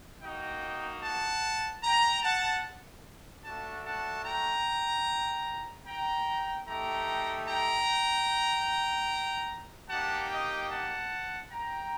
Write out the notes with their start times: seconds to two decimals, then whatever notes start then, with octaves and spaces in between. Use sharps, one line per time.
0.21 A#3 D#4 F#4 D#5 G5
1.03 F#5 A5
1.84 G5 A#5
2.23 F#5 A5
3.44 A3 D4 F#4 F#5 A5
3.84 F#5 A5
4.25 G5 A#5
5.86 G5 A#5
6.66 A3 D#4 G4 G5 A#5
7.47 G5 A#5
9.89 A#3 D#4 G4 F#5 A5
10.30 D#5 G5
10.70 F#5 A5
11.50 G5 A#5